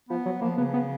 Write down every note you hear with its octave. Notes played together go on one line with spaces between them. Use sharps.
F3 B3
F#3
F3 A#3
C#3 B3
B3